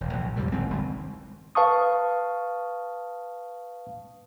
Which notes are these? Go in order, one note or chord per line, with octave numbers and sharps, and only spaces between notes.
E1
A#1 A#2
F2 G#2 C3 G3
G#1 A2 C4
G#1 C#2 G2 D#3
B4 F5 A5 C#6 D#6